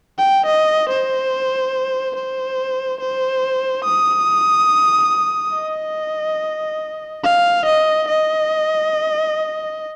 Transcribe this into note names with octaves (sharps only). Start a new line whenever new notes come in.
G5
D#5
C5
C5
C5
D#6
D#5
F5
D#5
D#5